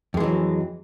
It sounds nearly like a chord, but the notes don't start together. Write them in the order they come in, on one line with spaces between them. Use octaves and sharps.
F2 G#3 E3 F#3